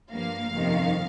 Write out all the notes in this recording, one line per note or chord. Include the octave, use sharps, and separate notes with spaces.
G2 F3 A#3 F5
G1 F2 C3 D#3